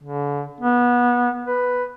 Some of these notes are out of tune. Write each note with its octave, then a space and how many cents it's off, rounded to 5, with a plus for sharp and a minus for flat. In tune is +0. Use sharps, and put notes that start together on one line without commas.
D3 -40
B3 -25
B4 +5